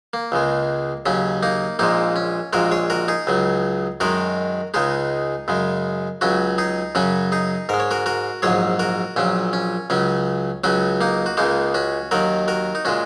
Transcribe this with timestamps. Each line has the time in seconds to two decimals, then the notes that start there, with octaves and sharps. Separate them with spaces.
0.13 A#3
0.32 C#2 C#3 G#3
1.06 D#2 C#3 F#3 C#4
1.43 A#3 D#4
1.79 A#1 A#2 G#3 A#3 D#4
2.16 C#4
2.53 A#1 A#2 G#3 F#4 A#4
2.72 G#4 C#5
2.90 F#4 A#4
3.08 D#4 G#4
3.27 C#2 C#3 F#3
4.00 F#2 D#3 G#3 F#4 A#4
4.74 C#2 C#3 G#3 D#4 G#4
5.48 F#2 C#3 G#3
6.21 C#2 C#3 F#3 C#4 F#4
6.58 D#4 G#4
6.95 F#2 C#3 F#3 C#4 F#4
7.32 D#4 G#4
7.69 G#2 G#3 A#4
7.80 C#5
7.91 F#4 A#4
8.06 F#4 A#4
8.42 A#1 G#2 F#3 G#4 C#5
8.79 F#4 A#4
9.16 A#1 A#2 F#3 C#4
9.53 C#4
9.90 C#2 C#3 F#3 C#4
10.64 C#2 C#3 F#3 C#4 F#4
11.01 A#3 D#4
11.26 F#4
11.37 C#2 C#3 G#3 A#3 D#4
11.74 C#4 F#4
12.11 D#2 D#3 F#3 F#4 A#4
12.48 F#4 A#4
12.75 D#4
12.85 A#2 G#3 C#4 F#4